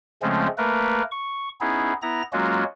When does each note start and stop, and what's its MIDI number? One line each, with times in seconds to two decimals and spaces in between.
0.22 0.48 49
0.22 0.48 53
0.22 0.48 56
0.22 0.48 57
0.22 0.48 60
0.22 0.48 61
0.58 1.02 57
0.58 1.02 58
0.58 1.02 70
0.58 1.02 71
1.11 1.49 85
1.61 1.93 59
1.61 1.93 61
1.61 1.93 63
1.61 1.93 64
1.61 1.93 68
2.02 2.22 59
2.02 2.22 64
2.02 2.22 82
2.02 2.22 94
2.33 2.64 54
2.33 2.64 56
2.33 2.64 58
2.33 2.64 61
2.33 2.64 65
2.33 2.64 66